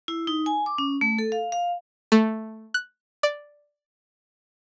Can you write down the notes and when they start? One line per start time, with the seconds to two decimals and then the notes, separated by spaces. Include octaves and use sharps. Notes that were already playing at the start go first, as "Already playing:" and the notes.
0.08 E4
0.27 D#4
0.46 G#5
0.66 D6
0.78 C#4
1.01 A3
1.18 A4
1.32 F5
1.52 F5
2.12 A3
2.74 F#6
3.23 D5